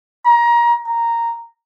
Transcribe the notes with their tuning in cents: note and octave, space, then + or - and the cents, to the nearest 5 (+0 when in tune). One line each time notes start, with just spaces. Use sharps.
A#5 +25
A#5 -5